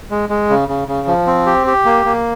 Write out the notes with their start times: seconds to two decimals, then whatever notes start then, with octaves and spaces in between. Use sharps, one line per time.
0.11 G#3
0.29 G#3
0.49 C#3
0.69 C#3
0.88 C#3
1.08 F3
1.27 C4
1.46 G4
1.67 G4
1.85 A#3
2.05 A#3